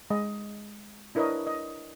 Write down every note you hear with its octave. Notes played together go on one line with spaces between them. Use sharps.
G#3 D#5
D4 E4 A#4 B4 C#5 D#5
D#5